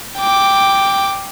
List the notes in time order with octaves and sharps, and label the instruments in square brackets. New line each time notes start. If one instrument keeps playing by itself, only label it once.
[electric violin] G5 D6